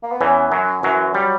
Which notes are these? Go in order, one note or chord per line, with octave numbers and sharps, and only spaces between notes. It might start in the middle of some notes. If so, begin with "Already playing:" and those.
A#3
B3
E2 E3 C#4
F#2 F#3
F#2 E3 F#3
F#3 G3